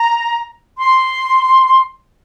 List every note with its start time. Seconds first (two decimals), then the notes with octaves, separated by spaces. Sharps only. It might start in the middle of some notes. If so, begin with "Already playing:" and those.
Already playing: A#5
0.78 C6